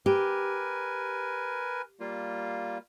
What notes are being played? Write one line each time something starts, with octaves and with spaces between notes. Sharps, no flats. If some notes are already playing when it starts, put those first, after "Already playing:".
G4 A#4 B4 G#5
G3 A#3 F4